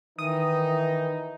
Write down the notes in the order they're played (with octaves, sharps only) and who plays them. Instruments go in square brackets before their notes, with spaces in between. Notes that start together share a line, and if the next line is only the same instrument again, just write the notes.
[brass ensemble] D#3 E3 D#4 [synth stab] D#6